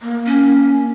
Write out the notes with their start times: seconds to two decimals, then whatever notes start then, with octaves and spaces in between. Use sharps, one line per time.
0.02 A#3
0.26 C#4